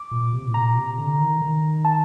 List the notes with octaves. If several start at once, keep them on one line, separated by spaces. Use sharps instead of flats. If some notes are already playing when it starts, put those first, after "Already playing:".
Already playing: D6
A#2
C3
A2
A#2 A#5
C3
D3
D#3
D#3
A5